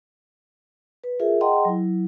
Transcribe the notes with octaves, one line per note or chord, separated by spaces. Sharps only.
B4
F4 G#4 A#4 E5
G#4 D#5 F#5 G5 A#5 C6
F#3 E4